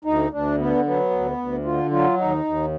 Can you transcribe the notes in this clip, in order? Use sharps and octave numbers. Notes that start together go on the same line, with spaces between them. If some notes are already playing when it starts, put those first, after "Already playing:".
D2 D#4
D2 D4
D3 B3
F#3 B3
D2
D2
D3 F4
F#3 F4
D#2 D#4
D#2